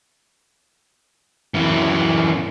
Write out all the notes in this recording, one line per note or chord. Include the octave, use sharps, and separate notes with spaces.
F#2 E3